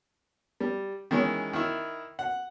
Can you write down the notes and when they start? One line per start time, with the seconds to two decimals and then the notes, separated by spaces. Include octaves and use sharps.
0.60 G3
1.11 D#3 E3 G#3 C#4
1.53 D#3 E4
2.19 F#5